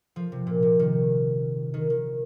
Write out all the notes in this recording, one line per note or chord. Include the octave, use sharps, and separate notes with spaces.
F3
C3
A#2
C3
D#3
D#3
D#3